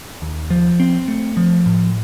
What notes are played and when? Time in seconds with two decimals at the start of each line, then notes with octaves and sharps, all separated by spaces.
0.22 D#2
0.50 F3
0.80 C4
1.08 A3
1.37 F3
1.66 A2